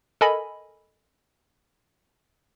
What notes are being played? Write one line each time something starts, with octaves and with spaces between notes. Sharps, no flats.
A4 A#4 D#5 G#5 B5